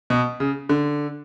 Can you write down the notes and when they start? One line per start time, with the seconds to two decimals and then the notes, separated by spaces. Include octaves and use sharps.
0.10 B2
0.40 C#3
0.69 D3